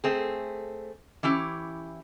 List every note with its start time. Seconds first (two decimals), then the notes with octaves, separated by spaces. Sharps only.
0.04 A3 C4 G#4
1.23 E3 C#4 E4 G4